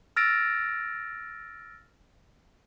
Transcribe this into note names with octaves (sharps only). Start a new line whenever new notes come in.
E6 F6 A6 A#6 D7